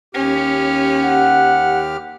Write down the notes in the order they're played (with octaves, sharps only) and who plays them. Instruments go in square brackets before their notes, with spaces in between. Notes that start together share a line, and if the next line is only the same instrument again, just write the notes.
[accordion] D#2 G4 F6 [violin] C#4
[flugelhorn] F#5